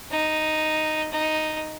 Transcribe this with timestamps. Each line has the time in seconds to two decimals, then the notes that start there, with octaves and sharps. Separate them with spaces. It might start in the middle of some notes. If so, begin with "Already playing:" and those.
0.11 D#4
1.12 D#4